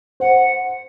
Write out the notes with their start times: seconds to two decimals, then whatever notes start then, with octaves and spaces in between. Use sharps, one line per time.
0.20 C5 F#5